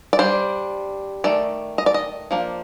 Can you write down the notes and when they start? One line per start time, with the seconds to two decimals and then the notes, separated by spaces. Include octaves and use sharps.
0.13 D5
0.19 G3 D4 C5
1.24 D#3 A3 D5
1.78 D#5
1.86 D5
1.94 D#5
2.31 F3 A#3 D4